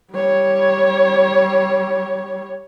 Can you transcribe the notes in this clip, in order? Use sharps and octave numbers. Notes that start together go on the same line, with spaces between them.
G3 C#5